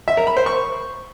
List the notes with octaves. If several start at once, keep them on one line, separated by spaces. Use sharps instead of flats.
E5
A#4
B5
C5
C#6